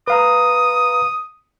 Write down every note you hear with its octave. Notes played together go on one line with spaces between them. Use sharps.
B4 F5 A#5 D#6